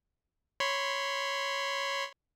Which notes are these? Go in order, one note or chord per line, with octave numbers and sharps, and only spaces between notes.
C#5 B5 C6